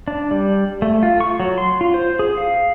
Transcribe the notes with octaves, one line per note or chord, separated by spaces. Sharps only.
D4
G3
A3
F4
C#6
F#3
C6
F4
C5
G#4
F5